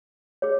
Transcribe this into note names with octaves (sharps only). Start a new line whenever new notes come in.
G#4 C#5